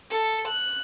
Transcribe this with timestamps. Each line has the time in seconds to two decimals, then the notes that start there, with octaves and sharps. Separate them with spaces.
0.11 A4
0.48 F#6